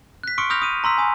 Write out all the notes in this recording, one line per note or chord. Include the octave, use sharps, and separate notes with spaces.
F#6 B6
C6 C#6 D#6 F6 C#7 D7
B5 D#6 F6 G6 A#6 F7
D#6 D#7
A#5 C6 E6 B6
G#5 D#6